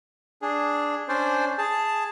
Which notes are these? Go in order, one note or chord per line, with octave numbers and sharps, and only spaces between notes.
D4 G#4
C#4 D4 C5 D5
G#4 A5